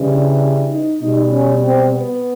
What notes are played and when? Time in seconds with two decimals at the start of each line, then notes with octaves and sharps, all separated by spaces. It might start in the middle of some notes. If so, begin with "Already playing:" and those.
Already playing: C#3 E3 G3
0.08 D4
0.69 D#4
1.00 B2 G3 D#4
1.31 C#4
1.62 C4
1.93 B3